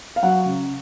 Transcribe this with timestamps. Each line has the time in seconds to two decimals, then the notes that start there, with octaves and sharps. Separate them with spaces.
0.16 F5
0.22 F#3 F#5
0.46 C#3